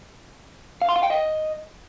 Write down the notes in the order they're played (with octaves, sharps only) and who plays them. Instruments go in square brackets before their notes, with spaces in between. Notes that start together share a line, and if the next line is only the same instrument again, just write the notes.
[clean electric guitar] F5
C6
F5
G5
D#5